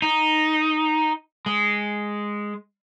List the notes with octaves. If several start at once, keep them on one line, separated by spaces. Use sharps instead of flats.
D#4
G#3